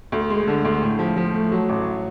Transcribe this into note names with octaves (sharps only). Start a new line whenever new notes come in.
D2
G#3
D3
D2
A2
F3
F3
A3
F#3
A1